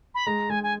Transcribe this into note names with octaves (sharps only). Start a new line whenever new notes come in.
B5
G#3 A#5
G#3 G#5
G#5